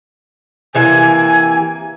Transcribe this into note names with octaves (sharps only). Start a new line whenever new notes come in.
C3 E3 A#3 G#5